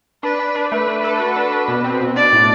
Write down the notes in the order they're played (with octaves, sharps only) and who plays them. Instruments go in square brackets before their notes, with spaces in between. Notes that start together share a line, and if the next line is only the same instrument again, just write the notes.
[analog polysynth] D4 [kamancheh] B4
[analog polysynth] D4
D4
[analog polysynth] A3 [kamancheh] B4
[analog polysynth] D4
A4
F#4
D4
D4
B2
C4
B2
[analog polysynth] D4 [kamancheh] D5
[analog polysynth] A2